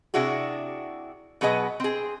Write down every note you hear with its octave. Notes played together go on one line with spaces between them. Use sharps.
C3 D4 E4 F#4 G#4
B2 F#3 G#4 B4 D#5
C4 G#4